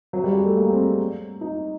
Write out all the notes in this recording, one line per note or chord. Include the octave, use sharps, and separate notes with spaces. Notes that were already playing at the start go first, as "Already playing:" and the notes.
F#3
G3
G#3
A3
A#3
C4
D#4